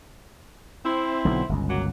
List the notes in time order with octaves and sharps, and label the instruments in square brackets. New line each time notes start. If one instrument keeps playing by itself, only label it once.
[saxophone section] C4 E4
[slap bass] B1 D3 B3
G1 C#2
[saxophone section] F#3 A#3 F#5